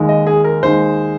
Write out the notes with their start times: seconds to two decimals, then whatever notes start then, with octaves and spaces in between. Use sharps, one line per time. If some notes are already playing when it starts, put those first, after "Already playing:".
Already playing: D#2 D#3 G#3 D#4
0.09 D#5
0.27 G#4
0.44 A#4
0.63 D#2 D#3 G#3 D#4 C5